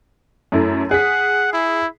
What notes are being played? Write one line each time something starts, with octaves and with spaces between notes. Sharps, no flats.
F#2 A3 E4
G#4 F#5 B6
E4